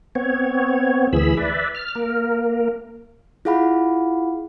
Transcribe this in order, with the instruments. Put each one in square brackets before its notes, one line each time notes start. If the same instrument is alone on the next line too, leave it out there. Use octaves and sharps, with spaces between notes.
[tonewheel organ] B3 C4 C#5
D2 E3 G#4 B5 E6
B4 D5 E5
F6
A#3 A#4
[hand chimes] E4 F4 G#4 F5 F#5 B5